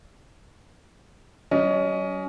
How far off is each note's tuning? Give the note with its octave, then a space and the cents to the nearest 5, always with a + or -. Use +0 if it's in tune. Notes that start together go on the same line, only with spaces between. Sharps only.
F#3 +45 C#4 +25 D#5 +0